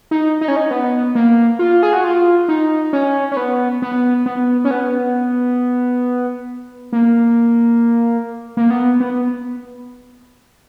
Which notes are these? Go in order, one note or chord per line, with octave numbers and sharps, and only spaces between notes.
D#4
D#4
C#4
D#4
B3
A#3
F4
G#4
F#4
F4
D#4
C#4
C#4
B3
B3
B3
C#4
B3
A#3
A#3
B3
B3